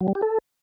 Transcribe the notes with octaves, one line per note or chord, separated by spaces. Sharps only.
F#3
G3
G4
A4